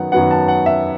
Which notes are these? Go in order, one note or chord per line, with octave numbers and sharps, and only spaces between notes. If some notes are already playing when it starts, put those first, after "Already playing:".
Already playing: F#2 D#3 F#3 B3 F#5
F#2 D#3 F#3 B3 F#5
A5
F#5
E5